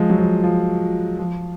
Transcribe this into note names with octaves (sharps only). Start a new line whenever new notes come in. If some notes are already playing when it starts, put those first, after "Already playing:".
Already playing: F3 G#3
F#3
F3
F3
F3